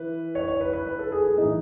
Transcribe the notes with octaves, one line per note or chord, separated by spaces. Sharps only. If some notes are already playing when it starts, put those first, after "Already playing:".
Already playing: E3 B4
C#5
C#5
B4
B4
B4
A4
G#4
G#4
A2 E3 D#4